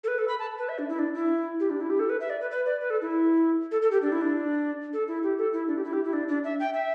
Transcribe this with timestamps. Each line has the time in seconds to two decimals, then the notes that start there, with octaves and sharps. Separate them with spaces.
0.04 A4
0.08 B4
0.18 A4
0.28 B5
0.39 A5
0.58 B4
0.69 E5
0.78 D4
0.89 E4
0.99 D4
1.15 E4
1.60 G4
1.70 D4
1.80 E4
1.90 G4
1.99 A4
2.10 B4
2.20 E5
2.30 D5
2.41 B4
2.51 B4
2.66 D5
2.81 B4
2.90 A4
3.02 E4
3.71 A4
3.82 A4
3.91 G4
4.02 D4
4.12 E4
4.21 D4
4.93 A4
5.08 E4
5.23 G4
5.38 A4
5.53 E4
5.68 D4
5.78 G4
5.84 E4
5.93 G4
6.04 E4
6.13 D4
6.28 D4
6.44 E5
6.60 G5
6.74 E5